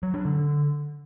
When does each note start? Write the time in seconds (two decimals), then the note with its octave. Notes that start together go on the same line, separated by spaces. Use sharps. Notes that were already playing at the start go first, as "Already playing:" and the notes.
0.03 F#3
0.14 D4
0.25 D3